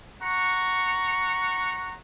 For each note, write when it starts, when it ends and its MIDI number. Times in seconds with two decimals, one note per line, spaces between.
0.21 1.95 78
0.21 1.95 82
0.21 1.95 85